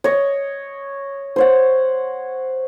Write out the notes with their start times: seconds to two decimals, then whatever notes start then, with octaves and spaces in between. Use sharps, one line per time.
0.04 C#5 D#5
1.36 C5 C#5 F#5